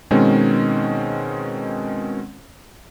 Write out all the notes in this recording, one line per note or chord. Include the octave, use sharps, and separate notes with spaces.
B2 D#3 G#3 C4 C#4